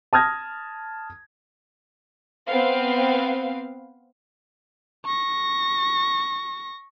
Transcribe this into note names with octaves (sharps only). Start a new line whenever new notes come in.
A5 D#6 F6 G#6 A#6
B3 C4 F5
C#6 A#6